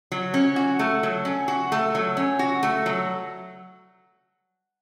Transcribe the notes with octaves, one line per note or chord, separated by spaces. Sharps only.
F#3
C#4
F#4
A3
F#3
C#4
F#4
A3
F#3
C#4
F#4
A3
F#3